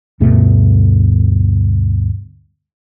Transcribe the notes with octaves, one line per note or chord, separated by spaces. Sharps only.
D2 G2 B2 A3